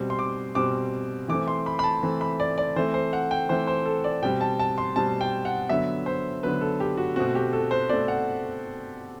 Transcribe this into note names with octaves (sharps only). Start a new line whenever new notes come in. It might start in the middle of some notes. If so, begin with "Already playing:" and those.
Already playing: B2 G3 C4
C6
D6
B2 G3 C4 D6
E3 A3 C4 D6
C6
B5
B5
A5
E3 A3 C4
B5
D5
D5
E3 A3 C4 C5
C5
F#5
G5
E3 A3 C4 C5
C5
A4
D5
B2 G3 C4 G5
A5
A5
C6
B2 G3 C4 A5
G5
F#5
D3 F#3 B3 E5
C5
D3 F#3 B3 B4
A4
G4
F#4
B2 A3 C4 F#4
G4
A4
C5
B2 A3 C4 D5
F#5